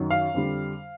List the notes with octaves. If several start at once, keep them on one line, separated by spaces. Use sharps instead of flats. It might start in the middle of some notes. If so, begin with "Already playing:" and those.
Already playing: F#2 D#3 F#3
F5
F2 D3 G3